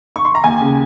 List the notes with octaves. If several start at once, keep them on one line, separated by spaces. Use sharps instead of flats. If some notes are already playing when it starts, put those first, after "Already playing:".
C#6
C6
A#5
D#2 G#5
C#3